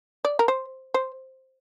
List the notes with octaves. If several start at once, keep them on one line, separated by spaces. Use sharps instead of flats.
D5
A#4
C5
C5